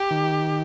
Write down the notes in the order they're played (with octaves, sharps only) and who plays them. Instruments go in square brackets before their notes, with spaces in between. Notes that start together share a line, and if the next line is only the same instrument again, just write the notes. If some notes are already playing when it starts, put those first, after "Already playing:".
Already playing: [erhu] G4
[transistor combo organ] D#3